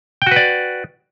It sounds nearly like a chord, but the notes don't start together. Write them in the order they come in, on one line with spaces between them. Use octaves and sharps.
G5 F#4 B4 D5